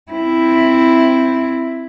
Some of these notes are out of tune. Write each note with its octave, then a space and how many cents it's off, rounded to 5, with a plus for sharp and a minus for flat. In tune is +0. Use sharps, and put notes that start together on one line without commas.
C4 +0 E4 +0